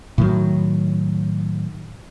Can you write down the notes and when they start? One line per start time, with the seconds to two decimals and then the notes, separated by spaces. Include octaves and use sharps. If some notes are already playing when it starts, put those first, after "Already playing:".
0.18 A2 D#3 F#3